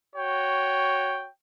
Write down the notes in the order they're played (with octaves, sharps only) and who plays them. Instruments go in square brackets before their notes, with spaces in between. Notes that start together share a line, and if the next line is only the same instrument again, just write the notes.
[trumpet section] F#4 C#5 G5